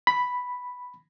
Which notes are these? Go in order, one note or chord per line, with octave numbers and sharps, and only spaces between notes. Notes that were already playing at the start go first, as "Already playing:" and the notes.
B5